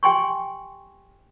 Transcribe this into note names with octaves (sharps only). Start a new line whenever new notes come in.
G4 G5 G#5 C6 C#6